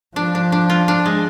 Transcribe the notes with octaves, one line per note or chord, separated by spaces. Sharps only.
F3 D4
D4
D4
F4
D4
G#3